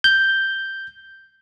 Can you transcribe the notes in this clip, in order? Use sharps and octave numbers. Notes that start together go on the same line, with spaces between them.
G6